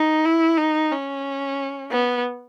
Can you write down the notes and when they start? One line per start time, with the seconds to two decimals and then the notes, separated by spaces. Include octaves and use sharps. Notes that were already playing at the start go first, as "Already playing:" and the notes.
Already playing: D#4
0.25 E4
0.58 D#4
0.92 C#4
1.91 B3